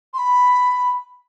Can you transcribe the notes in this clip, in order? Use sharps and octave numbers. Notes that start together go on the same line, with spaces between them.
C6
B5